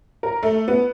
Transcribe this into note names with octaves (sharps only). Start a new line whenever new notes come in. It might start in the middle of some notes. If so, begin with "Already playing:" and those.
A#4
A3
B3